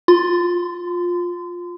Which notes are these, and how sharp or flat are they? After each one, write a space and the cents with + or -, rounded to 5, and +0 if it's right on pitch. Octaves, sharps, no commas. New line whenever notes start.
F4 +15 C6 -30